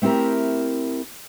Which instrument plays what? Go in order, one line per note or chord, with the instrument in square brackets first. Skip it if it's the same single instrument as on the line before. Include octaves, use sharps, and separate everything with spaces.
[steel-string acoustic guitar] A3 C4 E4 G4 A#4